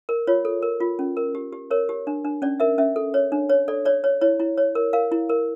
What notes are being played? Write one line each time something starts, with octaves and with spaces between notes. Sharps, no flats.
A#4
F4 C#5
A4
A#4
F4
C#4
A#4
G4
G4
A#4 C#5
G4
D4
D4
C#4 D5
A#4 E5
C#4 E5
A4
C#5
D4
C#5
A4 D5
C#5 D5
C#5
E4 C#5
E4
C#5
A#4
A#4 F5
E4
A#4